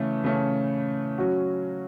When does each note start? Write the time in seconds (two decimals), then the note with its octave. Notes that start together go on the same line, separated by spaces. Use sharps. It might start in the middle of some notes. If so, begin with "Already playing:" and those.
Already playing: C#3 E3 A3 C#4
0.24 C#3 E3 A3 C#4
1.18 F#3 C#4 F#4